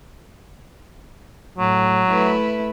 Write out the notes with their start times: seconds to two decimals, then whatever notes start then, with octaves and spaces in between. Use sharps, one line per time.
1.58 A2 F#3
2.07 A3 E4 B4